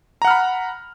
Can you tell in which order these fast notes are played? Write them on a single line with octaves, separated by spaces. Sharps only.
A#5 F#5 F6 B5